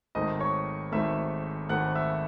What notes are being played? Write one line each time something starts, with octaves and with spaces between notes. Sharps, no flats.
G#1 G#2 D#3 A3 D#5 D#6
C#5 C#6
G#1 G#2 D#3 A3 E5 E6
G#1 G#2 D#3 A3 F#5 F#6
E5 E6